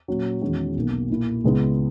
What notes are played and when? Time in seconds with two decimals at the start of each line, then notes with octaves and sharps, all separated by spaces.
0.08 A#2 F#3 C#4
0.42 E2 D#3 G#3 C#4 F#4
0.76 B1 B2 A#3
1.10 A#2 A#3 E4
1.44 C#2 C#3 G#3 B3 E4